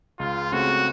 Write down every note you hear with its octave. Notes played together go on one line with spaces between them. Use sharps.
C#2 F4
C#3 A3 C4 F#4